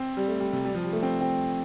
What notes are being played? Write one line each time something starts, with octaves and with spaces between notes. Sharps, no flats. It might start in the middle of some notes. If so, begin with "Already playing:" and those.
Already playing: C4
G3
A3
G3
C3
G3
F3
G3
A3
C4
C4